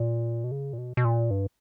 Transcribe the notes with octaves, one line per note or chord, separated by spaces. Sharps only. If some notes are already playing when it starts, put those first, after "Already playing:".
Already playing: A#2
B2
C#3
A#2
B2
B2
A#2
G2